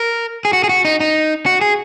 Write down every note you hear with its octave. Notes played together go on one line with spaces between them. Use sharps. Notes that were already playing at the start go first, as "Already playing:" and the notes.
Already playing: A#4
G#4
F#4
G#4
F#4
D#4
D#4
F#4
G#4